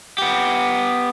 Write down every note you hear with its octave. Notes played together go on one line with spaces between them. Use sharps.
B3 G4